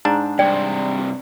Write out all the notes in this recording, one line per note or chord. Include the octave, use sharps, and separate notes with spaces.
G#2 D4 A#5
G2 C3 D5 G5